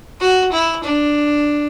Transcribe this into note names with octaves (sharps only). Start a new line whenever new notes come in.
F#4
E4
D4